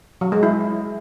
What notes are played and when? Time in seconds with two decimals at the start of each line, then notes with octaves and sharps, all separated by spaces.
0.21 F#3
0.32 G#3
0.43 E4